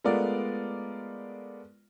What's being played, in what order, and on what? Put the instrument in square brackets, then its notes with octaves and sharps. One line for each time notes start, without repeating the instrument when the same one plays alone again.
[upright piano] G#3 A3 B3 F4 A#4 D5